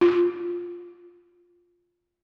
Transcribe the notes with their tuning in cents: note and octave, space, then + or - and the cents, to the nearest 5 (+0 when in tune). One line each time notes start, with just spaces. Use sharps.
F4 +5